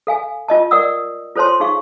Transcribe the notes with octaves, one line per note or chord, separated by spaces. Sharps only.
A4 F5 G#5
F4 D#5 A5
A#4 D5 F#5 D#6 E6
F4 A4 C5 C#5 A5 C6
D#4 G#4 F5 C#6